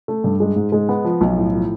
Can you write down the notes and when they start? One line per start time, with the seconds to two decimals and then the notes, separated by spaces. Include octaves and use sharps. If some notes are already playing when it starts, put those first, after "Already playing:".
0.08 A3
0.24 G2
0.40 G#3
0.56 G#2
0.72 G#3
0.89 B3
1.04 F3
1.21 B1
1.37 A2
1.53 F3